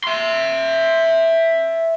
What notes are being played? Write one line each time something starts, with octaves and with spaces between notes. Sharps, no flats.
E5 C6